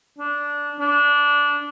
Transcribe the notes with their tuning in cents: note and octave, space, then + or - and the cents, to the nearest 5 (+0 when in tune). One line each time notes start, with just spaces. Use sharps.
D4 -15
D4 -15